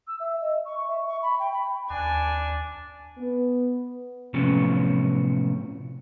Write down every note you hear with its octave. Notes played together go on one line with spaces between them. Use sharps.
E6
E5
D#5
C#6
C#6
E5
C#6
B5
G5
B5
D#2 D4 G#5
B3
A2 C3 F3 F#3 B3 C#4